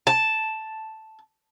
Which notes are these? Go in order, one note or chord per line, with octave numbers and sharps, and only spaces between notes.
A5